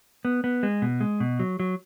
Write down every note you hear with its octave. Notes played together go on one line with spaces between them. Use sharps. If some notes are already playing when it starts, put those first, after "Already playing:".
B3
B3
G#3
B2
G#3
B2
F#3
F#3